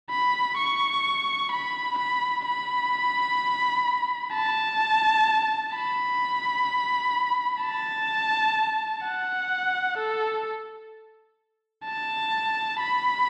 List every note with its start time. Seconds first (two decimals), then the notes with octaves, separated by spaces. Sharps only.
0.10 B5
0.57 C#6
1.52 B5
1.98 B5
2.45 B5
4.33 A5
5.74 B5
7.62 A5
9.04 F#5
9.98 A4
11.85 A5
12.80 B5